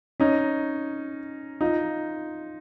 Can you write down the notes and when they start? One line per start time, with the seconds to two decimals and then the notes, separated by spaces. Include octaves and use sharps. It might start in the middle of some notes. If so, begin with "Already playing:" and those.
0.20 C#4 D#4
1.61 D#4 F4